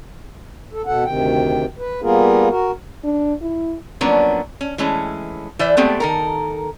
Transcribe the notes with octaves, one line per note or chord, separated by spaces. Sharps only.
A4
B2 A4 F#5
D2 C3 D#3 G5
B4
G3 A#3 B3 F4 G#4 A#4
F#4 A#4
D4
E4
F3 F#3 A#3 B3 C#4 D4
C#4
E3 G#3 A3 C#4
E3 C5 D5 E5
G#3 A3 B3 C4 G4
D#3 A4 A#4